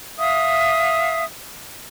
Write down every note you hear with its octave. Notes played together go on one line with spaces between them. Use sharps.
E5 F5 D#6